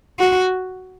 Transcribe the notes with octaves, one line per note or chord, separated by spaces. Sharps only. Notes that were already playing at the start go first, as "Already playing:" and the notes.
F#4